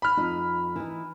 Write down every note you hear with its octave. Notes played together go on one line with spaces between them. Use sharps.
B5 F6
F2 D#4
E3 D#4